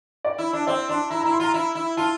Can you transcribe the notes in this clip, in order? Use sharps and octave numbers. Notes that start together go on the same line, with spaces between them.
D5
E4
D4
C4 D5
D4 C6
E4 A#5
A#5
E4
C6
F4 A#5
E4
E4
F4 A5